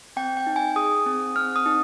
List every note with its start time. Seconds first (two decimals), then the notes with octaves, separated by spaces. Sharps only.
0.16 C4 G5
0.37 G5
0.47 D#4
0.56 G#5
0.76 G#4 D#6
1.06 C4
1.36 C4 F6
1.56 D#6
1.66 D#4